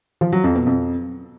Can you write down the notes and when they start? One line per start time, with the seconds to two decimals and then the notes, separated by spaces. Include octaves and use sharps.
0.21 F3
0.32 F#3
0.44 F2
0.55 B2
0.67 F2